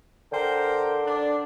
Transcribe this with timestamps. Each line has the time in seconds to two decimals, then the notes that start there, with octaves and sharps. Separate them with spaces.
0.32 D3 A#4 C5 G5
1.06 D4